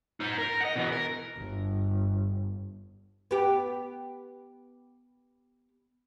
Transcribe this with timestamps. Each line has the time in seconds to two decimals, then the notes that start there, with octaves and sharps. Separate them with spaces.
0.20 D#4 C5
0.38 A#4
0.60 D#5 F#5
0.76 B2 E3
0.92 A#4
1.37 G1
3.31 B3 G4